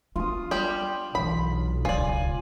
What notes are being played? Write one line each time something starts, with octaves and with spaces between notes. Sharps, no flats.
B3 D4 F4 D#6
G3 G4
B1 E3 D4 B5
D1 C#2 F4 D5 G#5